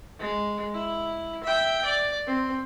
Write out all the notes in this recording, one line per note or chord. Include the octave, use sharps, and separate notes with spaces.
G#3
E4
E5 G5
D5
C4